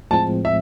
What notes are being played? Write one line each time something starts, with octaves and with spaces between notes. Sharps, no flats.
A2 F3 G#3 C4 A5
E5